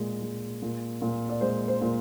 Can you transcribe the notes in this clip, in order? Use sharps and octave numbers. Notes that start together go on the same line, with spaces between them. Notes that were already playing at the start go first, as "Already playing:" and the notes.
Already playing: A#2 G#3
G#3
A#2
A#2
D5
G#3 C5
C5
A#2